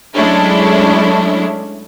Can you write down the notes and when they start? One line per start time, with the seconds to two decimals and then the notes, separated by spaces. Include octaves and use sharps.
0.15 F#3 G#3 A3 C#4 D4 E4